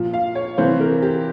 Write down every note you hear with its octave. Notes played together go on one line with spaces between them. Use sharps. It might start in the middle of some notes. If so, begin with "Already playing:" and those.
Already playing: A#2 F3
F5
C#5
C3 E3 C5
A#4
G4